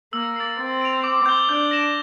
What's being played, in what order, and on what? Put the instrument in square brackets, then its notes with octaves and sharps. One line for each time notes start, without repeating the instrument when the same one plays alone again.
[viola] A#3 [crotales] E6
[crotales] A6 C7
[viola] C4 [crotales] A6
[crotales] D7 F7
D6
G6 C7 G7
[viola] D4 [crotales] G6
[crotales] A#6 E7